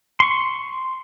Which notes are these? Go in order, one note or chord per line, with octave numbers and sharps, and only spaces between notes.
C6 C#6